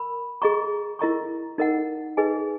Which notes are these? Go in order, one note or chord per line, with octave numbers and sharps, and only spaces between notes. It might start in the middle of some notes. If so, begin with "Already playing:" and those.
Already playing: A#4 B5
G#4 D#5 A#5 C#6
E4 A#4 D#5 A#5 C#6
D#4 A#4 D#5 F#5
D#4 G#4 B4 D#5 G#5